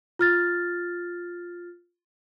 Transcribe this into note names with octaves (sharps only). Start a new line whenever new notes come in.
F4 F6 A6